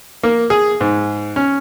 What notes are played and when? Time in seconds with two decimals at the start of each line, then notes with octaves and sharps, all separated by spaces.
0.23 A#3
0.50 G#4
0.81 G#2
1.36 C#4